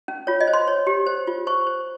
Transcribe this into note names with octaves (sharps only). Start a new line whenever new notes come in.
C#4
F4 C#5
D#5
C5
C6
C#5
G4
C5
F4
C5 C#6
C5